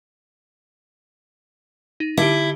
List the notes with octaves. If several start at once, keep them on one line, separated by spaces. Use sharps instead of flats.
D#4
D3 E4 G4